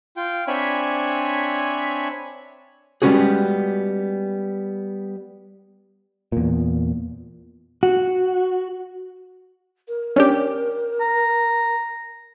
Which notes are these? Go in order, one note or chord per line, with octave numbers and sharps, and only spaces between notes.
F4 G5
C4 D4 C#5 E5 G#5 B5
G3 G#3 B3 C#4 F#4 G#4
E2 A#2
F#4
A#4
C#4 D4 G4
A#5